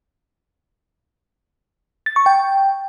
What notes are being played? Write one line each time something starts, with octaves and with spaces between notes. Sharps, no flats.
A6
C#6
G5